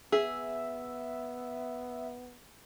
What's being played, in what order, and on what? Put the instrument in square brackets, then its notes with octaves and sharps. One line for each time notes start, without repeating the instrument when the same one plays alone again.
[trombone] B3 [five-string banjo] G#4 [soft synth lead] E5